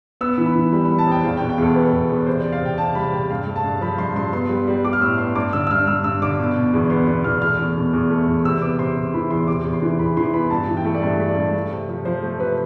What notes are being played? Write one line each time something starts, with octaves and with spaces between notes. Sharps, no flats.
B3 E6
E3
B5
E3
G3 B5
G3 B5
A5
F2 G5
E2 F5
G5
B2
G5
E2 A4
B3 B4
E2
E2
C3 C5
C3 D5
F5
C3 G5
C3 A5
G3 B5
C3 G5
G2 F5
A3
A5
G2
F3 B5
G2 C6
G2 C6
B3 C6
G3
G3
G3 D6
F6
A2 E6
B3 C6
G2 D6
D3 E6
E6
G2 F6
G2 E6
G2 E6
D3 D6
B2
B2
E2
B3 C6
B2
E2 F6
A3 F6
E2
B2
E2
A3
E2
C3 E6
B3 D6
C3 C6
C3
E3 B5
E2 C6
C3 D6
E2
C6
E3
E2 B5
E3 C6
B3 B5
G2 A5
E3
G5
A3
D5
G2 E5
A3
D5
G2
A3
C3
F3
F3 C5
A3
C3 B4